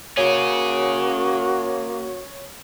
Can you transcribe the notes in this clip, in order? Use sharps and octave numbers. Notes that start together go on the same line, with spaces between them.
A#3 C#4 F#4 G#4 C#5